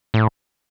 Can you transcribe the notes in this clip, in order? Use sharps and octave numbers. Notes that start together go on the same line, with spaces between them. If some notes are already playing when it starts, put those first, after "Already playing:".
A2